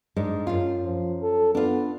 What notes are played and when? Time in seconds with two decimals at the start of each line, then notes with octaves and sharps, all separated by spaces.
0.16 G#2 G#3 D4
0.47 F#2 F4
0.84 F3
1.23 A4
1.55 B3 D4 F4